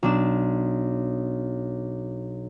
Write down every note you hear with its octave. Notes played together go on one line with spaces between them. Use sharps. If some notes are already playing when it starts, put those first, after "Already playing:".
B1 D4 E7